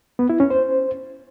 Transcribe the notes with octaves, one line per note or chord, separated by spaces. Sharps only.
B3
E4
C#4
C5